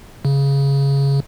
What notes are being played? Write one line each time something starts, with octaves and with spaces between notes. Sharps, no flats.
C#3